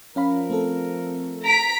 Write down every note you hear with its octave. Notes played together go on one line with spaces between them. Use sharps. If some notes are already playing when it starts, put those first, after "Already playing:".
F3 C#4 A#4 F5 B5
A3 C4 A4
A#5 B6 D7